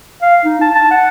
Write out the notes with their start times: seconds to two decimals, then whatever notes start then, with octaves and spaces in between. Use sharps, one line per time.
0.22 F5
0.45 D#4
0.61 A5
0.75 A5
0.91 F#5